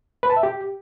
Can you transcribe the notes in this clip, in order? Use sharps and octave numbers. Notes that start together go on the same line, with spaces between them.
B4
A5
E5
G4